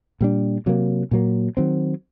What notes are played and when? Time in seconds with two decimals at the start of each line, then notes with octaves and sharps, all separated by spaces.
0.21 A#2 G3 D4
0.66 C3 F#3 A#3
1.11 A#2 F#3 A#3
1.57 D#3 F#3 C4